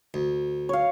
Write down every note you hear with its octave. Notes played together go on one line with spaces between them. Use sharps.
D2
C#5 F5